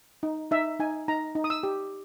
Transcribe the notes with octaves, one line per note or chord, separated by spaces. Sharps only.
D#4
D#4 E5
D#4 G#5
D#4 A#5
D#4
D#6
E6
G4